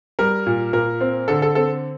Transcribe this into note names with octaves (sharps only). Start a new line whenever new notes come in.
G3 A#4
A#2
A#2 A#4
C4
D3 A4
A4
C4 A4